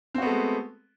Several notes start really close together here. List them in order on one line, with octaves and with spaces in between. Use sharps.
C4 F#4 B3 A3 G#3